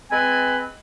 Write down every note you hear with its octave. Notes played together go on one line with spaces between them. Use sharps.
G#3 C4 B4 G#5